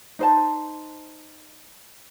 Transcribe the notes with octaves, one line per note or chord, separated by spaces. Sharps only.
D#4 C5 A5